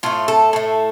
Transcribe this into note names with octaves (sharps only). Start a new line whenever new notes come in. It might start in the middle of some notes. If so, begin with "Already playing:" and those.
A2 A3 F4
A4
A2 A3